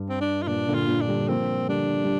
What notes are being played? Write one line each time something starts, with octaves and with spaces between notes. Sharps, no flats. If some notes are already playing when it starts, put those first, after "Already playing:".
Already playing: G2
C4
D4
F4
A#2 D4
A#2 D3
F4
A#2 D3
D4
D3 G3
F3 A#3 C4
D3 G3 D4
G3